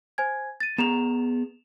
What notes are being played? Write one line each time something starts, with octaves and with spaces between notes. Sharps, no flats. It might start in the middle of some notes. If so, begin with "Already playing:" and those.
C5 G#5 G#6
A6 D#7
B3 G#4 A#5 E7 F7